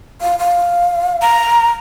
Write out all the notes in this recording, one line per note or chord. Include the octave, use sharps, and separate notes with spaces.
F5
F5
A#5